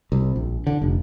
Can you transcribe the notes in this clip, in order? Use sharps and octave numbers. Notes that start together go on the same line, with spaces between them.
C2
A#1
D3
F1